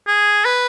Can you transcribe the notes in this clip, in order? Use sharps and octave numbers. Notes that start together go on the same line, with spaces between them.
G#4
B4